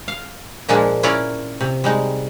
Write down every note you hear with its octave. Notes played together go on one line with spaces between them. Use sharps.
F5
A#2 F3 G#3 A#3 D4
C#4 E4 F4 A#4 C#5 D5
C3
G3 G#3 D#4